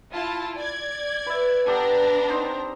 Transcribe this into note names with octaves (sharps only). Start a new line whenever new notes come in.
E4 F4 A5
D5 G#6
B4 E5
B3 D4 G4 A4 A#5
C4 D#4 C5